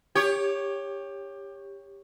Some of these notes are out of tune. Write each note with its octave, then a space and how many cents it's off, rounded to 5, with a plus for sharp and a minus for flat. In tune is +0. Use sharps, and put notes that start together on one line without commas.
G4 +20 C#5 +0